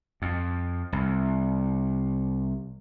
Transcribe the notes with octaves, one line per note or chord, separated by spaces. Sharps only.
F2
C2